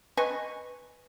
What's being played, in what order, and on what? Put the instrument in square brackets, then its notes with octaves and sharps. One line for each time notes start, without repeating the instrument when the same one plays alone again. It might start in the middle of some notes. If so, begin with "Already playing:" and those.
[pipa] B4 D#5 G#5 C#6